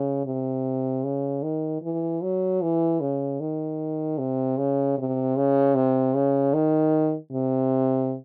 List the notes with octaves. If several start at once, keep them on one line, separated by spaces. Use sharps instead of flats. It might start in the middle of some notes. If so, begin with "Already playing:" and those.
Already playing: C#3
C3
C#3
D#3
E3
F#3
E3
C#3
D#3
C3
C#3
C3
C#3
C3
C#3
D#3
C3